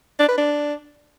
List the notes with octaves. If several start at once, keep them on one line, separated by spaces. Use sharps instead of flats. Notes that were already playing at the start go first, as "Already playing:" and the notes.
D4
B4
D4